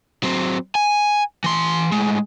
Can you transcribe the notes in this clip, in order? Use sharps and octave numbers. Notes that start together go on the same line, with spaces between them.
F#3 C4
G#5
E3 C6
A2 G#3